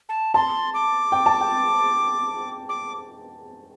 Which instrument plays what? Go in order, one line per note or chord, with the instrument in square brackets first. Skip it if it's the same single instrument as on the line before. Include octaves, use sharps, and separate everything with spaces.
[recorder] A5
[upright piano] A5 [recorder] C6
[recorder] D6
[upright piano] G5
A5
G5
[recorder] D6